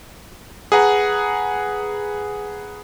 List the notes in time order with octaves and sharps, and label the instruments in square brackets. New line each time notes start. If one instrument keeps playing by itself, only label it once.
[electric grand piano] G#4 B4 F#5 A#5